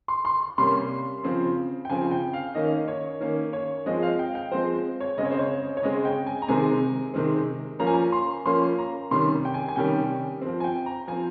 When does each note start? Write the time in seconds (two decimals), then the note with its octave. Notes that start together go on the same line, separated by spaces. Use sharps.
0.08 C6
0.25 C6
0.58 C3 G3 A#3 C#4 C6
1.23 C#3 F3 C4
1.85 G5
1.89 C#3 F3 C4 G#5
2.11 G5
2.33 F5
2.55 D#3 A#3 C#4 D#5
2.88 C#5
3.20 D#3 A#3 C#4
3.53 C#5
3.86 F3 G#3 C4 D#5
4.02 F5
4.19 G5
4.35 G5
4.51 F3 G#3 C4 C5
5.00 C#5
5.18 C#3 G#3 C4 D#5
5.25 C#5
5.31 C5
5.39 C#5
5.77 C#5
5.82 C#3 G#3 C4 D#5
6.05 G5
6.26 G#5
6.42 A#5
6.48 C3 D#3 G#3 C4 G#5
7.14 C3 D#3 G#3 C4
7.79 F3 A#3 C#4 A#5
7.87 G#5
7.94 A#5
8.12 C6
8.45 F3 A#3 C#4 C6
8.78 A#5
9.11 C3 D#3 G3 C#4 C6
9.45 G5
9.54 G#5
9.68 G#5
9.76 C3 D#3 G3 C#4 G5
10.42 F3 C4
10.60 G#5
10.64 G5
10.86 A#5
11.08 F3 C4 G#5